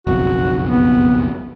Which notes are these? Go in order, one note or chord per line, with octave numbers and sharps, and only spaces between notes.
F#1 B1 F2 F#4
B3